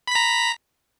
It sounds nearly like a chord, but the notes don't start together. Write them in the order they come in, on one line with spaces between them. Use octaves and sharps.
B5 B6 A#5